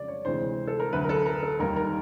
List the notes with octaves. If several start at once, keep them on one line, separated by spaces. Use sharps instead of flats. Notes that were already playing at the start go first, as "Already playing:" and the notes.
Already playing: F2 C#3 F3 G#3 D5
C#5
D2 C3 E3 G#3 C5
A4
A#4
D2 D3 F#3 B4
A#4
A4
A#4
A4
D#2 D#3 G3 A#4
A#4